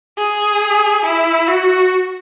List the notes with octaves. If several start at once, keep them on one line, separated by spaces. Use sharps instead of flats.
G#4
E4
F#4